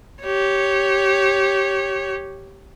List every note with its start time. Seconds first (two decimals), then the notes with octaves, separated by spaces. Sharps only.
0.23 G4 C#5